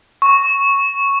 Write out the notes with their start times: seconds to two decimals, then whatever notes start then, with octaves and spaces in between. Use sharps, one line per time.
0.22 C#6